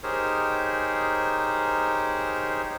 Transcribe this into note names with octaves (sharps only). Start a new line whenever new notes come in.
D#4 G4 G#4 A#4 C5 C#5